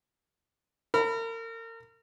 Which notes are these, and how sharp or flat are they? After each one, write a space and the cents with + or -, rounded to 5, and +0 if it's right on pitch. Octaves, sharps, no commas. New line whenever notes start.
A#4 -35 B5 +0